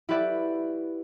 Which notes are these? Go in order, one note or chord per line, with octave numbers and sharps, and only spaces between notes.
E4 F#4 G4 B4 D5 E5